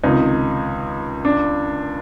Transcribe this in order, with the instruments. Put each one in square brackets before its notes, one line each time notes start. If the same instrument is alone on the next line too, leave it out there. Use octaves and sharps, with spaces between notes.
[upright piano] C#2 C3 D#3 [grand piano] D#4
[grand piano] D4